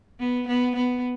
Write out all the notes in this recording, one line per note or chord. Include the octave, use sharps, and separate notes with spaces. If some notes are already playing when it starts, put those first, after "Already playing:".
B3
B3
B3